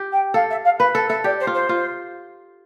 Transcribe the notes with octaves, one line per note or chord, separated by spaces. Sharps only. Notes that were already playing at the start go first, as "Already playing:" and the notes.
Already playing: G4
G5
A4 F5
E5
F5
B4 B5
A4 A5
A4 E5
G4 D5
C5
F4
C5
F4